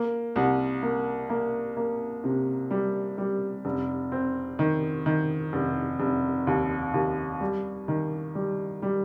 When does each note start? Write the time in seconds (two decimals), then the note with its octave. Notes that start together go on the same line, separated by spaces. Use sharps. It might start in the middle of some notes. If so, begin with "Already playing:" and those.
Already playing: A#3
0.36 C2
0.83 A#3
1.30 A#3
1.77 A#3
2.24 C3
2.71 G3
3.18 G3
3.65 F1
4.12 C4
4.59 D#3
5.06 D#3
5.53 F1
6.00 F1
6.47 D#2
6.94 D#2
7.41 G3
7.88 D#3
8.35 G3
8.82 G3